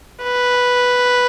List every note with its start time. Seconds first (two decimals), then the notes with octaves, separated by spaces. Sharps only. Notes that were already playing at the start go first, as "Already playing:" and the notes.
0.23 B4